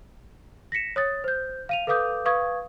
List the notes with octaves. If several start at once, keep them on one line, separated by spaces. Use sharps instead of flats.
A#6 B6 C#7 E7
C#5 D#6 A6
C5 G6
F5 D#7 F7
A4 B4 F5 D6 D#6 G6
B4 F5 C#6 D#6 G#6